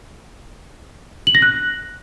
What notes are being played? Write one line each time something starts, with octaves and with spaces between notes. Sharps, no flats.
F#7
A#6
F#6